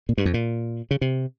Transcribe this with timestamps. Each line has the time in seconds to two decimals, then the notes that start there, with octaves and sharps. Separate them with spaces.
0.09 A#2
0.18 G2
0.25 F2
0.34 A#2
0.91 C#3
1.01 C3